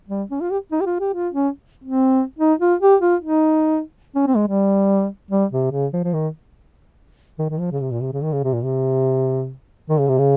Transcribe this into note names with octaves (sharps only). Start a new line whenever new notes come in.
G3
C#4
F4
G4
D#4
G4
F4
G4
F4
C#4
C4
D#4
F4
G4
F4
D#4
C#4
C4
G#3
G3
G3
C3
C#3
F3
F3
D#3
D#3
D#3
F3
C#3
C3
A#2
C3
C#3
D#3
C#3
C3
A#2
C3
D#3
C#3
C3
C#3